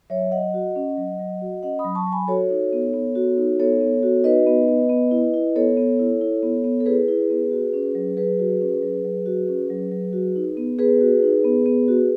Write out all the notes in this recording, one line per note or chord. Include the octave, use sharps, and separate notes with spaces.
F#3 C#5 E5
F#3 D#5 F#5
F#4
C#4
F#3
F#3
F#4
C#4 D#5 F#5
B5 D#6
F#3
A5 C#6
F#3
G#5 B5
F#4 A4 C#5
D#4
B3
B3
F#4
D#4
B3 A4 C#5
B3
F#4
D#4 B4 D#5
B3
B3
B3
E4
E4
B3 A4 C#5
B3
E4
E4
B3
B3
A4
E4 G#4 B4
E4
B3
F#4
C#4
F#3
F#3 G#4 B4
F#4
C#4
F#3
F#3
F#4
C#4
F#3
F#3
F#4
D#4
B3
B3 G#4 B4
F#4
D#4
B3
B3
F#4